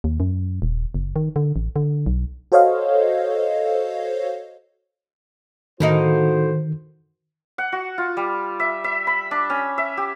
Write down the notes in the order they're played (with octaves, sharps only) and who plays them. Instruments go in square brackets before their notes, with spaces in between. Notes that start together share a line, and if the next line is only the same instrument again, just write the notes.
[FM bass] D#2
F#2
D#1
F#1
D#3
D3
A1
D3
B1
[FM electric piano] F#4 A4 C5 C#5 D#5 F5
[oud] A2 A#3 D#4 [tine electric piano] D#3 [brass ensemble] F#4 C5
[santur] F#5
F#4
F4
G3
E5
E5
B5
D4
C#4
E5
G4